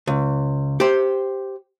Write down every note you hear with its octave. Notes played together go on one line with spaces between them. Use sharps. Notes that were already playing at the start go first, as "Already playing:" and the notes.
C#2
G4 C5